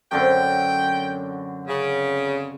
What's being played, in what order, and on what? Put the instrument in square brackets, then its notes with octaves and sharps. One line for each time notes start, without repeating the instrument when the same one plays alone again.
[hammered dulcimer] F#2 D3 C4 [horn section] G5
[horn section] C#3